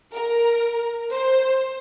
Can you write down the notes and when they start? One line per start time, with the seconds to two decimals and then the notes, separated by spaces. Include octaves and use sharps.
0.13 A#4
1.12 C5